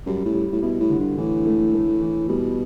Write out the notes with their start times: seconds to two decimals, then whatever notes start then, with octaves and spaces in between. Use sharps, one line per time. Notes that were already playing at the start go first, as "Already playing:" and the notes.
0.06 F#2 G3
0.25 A2
0.35 G3
0.53 A2
0.62 B2 E4
0.80 A2
0.90 D3
0.99 G2
1.18 A2 E3
1.46 A3
1.74 A3
2.01 E3
2.29 B2 G3